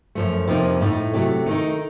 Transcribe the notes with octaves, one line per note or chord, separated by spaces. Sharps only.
F#2 F3 A3
F2 C3 F3 A#3 D#4
A2 A3 D#4
C3 F#3 A3
D#3 A3 D#4